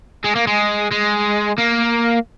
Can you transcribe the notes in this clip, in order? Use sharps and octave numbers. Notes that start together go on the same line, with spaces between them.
G#3
A#3
G#3
G#3
A#3